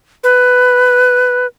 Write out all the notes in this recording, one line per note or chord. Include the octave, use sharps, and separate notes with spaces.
B4